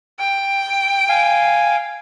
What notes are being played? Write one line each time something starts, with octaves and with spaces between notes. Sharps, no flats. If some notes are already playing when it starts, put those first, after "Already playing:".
G5
F5 G#5